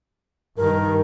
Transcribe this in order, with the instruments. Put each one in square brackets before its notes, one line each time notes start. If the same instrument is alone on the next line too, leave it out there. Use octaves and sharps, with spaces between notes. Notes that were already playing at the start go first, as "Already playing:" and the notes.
[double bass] G2 D#3 [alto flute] A#4